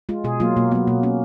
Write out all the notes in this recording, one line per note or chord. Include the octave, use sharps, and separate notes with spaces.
G#3 F4
B2 G#4
F#3 A#3 F4
B2 A#3
F#3 A#3 B3
B2 A#3
A#3 C#4